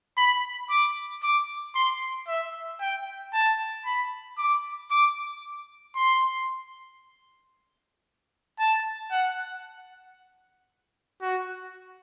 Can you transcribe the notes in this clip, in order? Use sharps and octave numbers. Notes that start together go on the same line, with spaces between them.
B5
D6
D6
C6
E5
G5
A5
B5
D6
D6
C6
A5
F#5
F#4